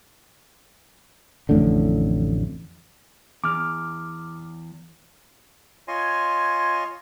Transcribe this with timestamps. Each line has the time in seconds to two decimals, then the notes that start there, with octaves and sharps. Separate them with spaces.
1.49 A1 F2 A2 D3
3.44 E2 D6 F6
5.88 F4 C#5 D#5 G#5 C6